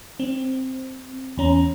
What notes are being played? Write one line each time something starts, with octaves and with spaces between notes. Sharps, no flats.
C4
E2 C#4 A#5